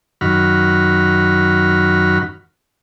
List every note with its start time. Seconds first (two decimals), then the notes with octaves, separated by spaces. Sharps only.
0.21 F#2 D#3 F#4 B5 F6